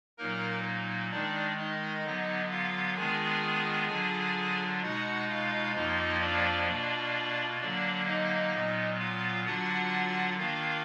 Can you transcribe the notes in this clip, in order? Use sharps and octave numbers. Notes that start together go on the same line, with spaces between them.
A#2 F#3 A#3 D#4 A#4
D#3 G#3 D4 D#4 D5
D#4 D#5
D3 F#3 B3
F4 F5
D#3 G#3 B3 D4 F4 G#4 G#5
D3 F#3 D4 F4
B2 G#3 D#4 F#4 F#5
F4 F5
F2 F3 A#3 D#4 F4 D#5
D4 D5
B2 A#3 F4
D3 F#3 A#3 D4 D5
D#4 D#5
A#2 F#3 B3
F4 F5
D3 F#3 D4 F4 F#4 F#5
D#3 A#3 D4 F4 F5